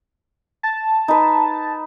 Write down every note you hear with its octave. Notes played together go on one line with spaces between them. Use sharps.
A5
D#4 B4